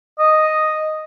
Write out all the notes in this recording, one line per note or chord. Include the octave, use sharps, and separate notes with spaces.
D#5